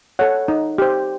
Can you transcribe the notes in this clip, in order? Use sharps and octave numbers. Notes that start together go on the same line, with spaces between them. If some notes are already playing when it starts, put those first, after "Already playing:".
A4 C#5 F#5
D#4
G4 C5